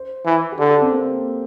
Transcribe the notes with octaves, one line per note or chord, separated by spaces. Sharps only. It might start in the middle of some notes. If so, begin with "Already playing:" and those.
Already playing: C5
E3
G4
D3 A4
G4
C4
A#3